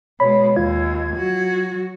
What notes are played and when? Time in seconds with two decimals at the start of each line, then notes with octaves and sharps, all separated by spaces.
0.20 B2 G#3 C#5 B5
0.56 D#2 F4 G#6
1.17 F#3 F#4